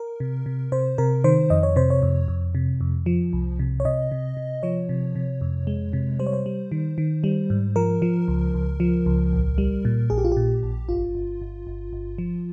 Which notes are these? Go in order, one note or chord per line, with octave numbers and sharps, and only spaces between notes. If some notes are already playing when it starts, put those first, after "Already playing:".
Already playing: A#4
C3
C3
C3 C5
C3 A#4
D#3 C5
F2 D#5
C#5
C3 C5
C#5
F2
F2
C3
F2
F3
C2
C3
C#5
C3 D#5
C3
C3
F3 C#5
C3
C3
F2
G#3
C3
G3 C5
C#5
C5
G3
D#3
D#3
G3
G#2
F3 A#4
F3
C#2
C#2
F3
C#2
A#1
G3
A#2
A#1 G#4
G4
F4
A#2 G4
A#1
G1 F4
G1
G1
G1
G1
F3